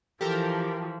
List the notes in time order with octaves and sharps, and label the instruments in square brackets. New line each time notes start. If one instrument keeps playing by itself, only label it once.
[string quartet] E3 F3 [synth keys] G4 A4 A#4